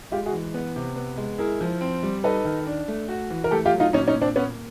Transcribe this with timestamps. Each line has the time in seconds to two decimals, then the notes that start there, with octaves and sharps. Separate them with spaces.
0.12 G#3 F4 G4
0.26 F#4 G#4
0.33 E3
0.54 B3
0.76 C3
0.96 B3
1.18 G#3
1.38 E4 G#4 A#4
1.61 F3
1.81 C4
2.03 G3
2.24 D#4 A4 B4
2.45 D#3
2.67 D4
2.88 A3
3.08 F#4
3.30 E3
3.44 A#4
3.51 A3 G4 A4
3.66 F4 G4
3.73 F#3
3.80 D#4 F4
3.93 A#2 C#4 D#4
4.08 C#4 D#4
4.15 A#2
4.22 C4 D4
4.36 A#3 B3 C#4